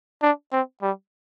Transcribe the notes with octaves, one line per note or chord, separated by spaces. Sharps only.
D4
C4
G3